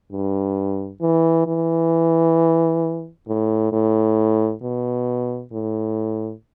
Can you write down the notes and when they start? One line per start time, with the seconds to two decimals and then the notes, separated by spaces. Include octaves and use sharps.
0.11 G2
1.01 E3
1.47 E3
3.28 A2
3.72 A2
4.62 B2
5.52 A2